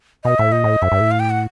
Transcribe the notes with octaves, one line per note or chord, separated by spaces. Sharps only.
B2 D#5
A2 E5
A#2 D#5
A2
F#2 E5
G2
A2
F5
G5
F#5